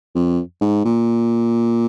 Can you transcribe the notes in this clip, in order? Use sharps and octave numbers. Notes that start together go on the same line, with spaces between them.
F2
G#2
A#2